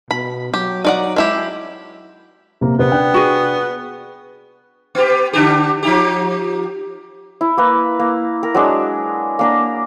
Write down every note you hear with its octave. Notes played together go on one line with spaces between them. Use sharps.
B2 B5
F#3 G4
D#4 D5 F#5
G#3 E4 G4
C3 A#3
C3 B3 C4 A#4
D4 G5 F#6
F#4 G#4
B3 G4
D3 D4 G4
F3 D#4 G4
E4
A#3 B4
A#3
A#4
F#3 G#3 D4
A#3 D4 A#5